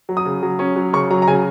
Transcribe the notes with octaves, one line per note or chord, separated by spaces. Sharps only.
F#3
D#6
C#3
F#3
C#4
F#3
C#3 C#6
F#3 A#5
A#5
C#3 G#5